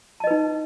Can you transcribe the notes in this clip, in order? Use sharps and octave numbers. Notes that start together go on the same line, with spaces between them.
D#4 B4 D#5 A5